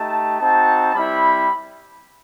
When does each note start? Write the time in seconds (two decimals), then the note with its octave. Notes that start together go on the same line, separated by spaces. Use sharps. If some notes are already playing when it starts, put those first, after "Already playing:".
Already playing: A3 D#4 G4 A5
0.39 C4 D#4 F#4 A5
0.94 G3 C4 E4 B5